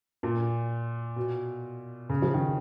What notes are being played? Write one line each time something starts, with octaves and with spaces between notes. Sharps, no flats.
A#2
B2
C#3
F3
D#3